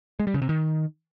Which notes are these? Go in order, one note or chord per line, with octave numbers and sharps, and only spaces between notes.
G#3
G3
C#3
C3
D#3